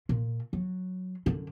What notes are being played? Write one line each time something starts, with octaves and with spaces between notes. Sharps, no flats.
A#2
F#3
F#2 D3